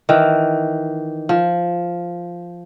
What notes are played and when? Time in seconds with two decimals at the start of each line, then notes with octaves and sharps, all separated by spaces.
0.09 D#3 E3
1.29 F3